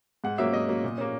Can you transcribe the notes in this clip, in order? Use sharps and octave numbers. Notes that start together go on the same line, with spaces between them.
G#2 F#5
F#3 A#3 C#4 E5
G#2 D#5
F#3 A#3 C#4
A#2
A#3 C#4